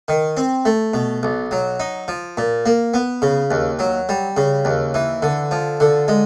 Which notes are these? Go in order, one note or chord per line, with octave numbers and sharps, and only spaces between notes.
D#3
C4
A3
B2
B1
F#3
D#4
F3
A#2
A#3
B3
C#3
D#2
F#3
G3
C#3
D#2
E3
D3
F3
D3
G#3